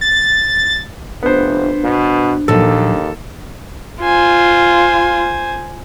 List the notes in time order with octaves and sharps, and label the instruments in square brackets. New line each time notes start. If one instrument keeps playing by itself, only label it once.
[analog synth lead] A6
[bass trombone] F1 [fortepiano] B3 C5 [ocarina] D4
[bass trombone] B2
[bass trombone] D#2 [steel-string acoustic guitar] A#2 F3 F#3 [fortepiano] A4
[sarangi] F4 [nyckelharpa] C5 G#5